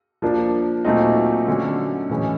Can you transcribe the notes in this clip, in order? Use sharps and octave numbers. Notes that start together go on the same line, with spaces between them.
F3 A#3 D4
A#2 F#3 A3 C4 D#4
D3 F#3 A3 C#4
A2 E3 G#3 C#4